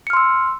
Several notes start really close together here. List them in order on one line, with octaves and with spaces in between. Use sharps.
C#7 F6 C6 E6